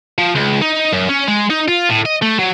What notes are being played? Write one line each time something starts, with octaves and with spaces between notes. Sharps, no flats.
F3
C#2
D#4
F#2
C#4
G#3
D#4
F4
A2
D#5
A3
F#3